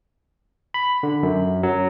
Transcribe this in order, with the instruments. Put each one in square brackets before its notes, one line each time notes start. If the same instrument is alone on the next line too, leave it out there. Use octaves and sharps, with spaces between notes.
[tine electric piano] B5
D3
F#2
F#3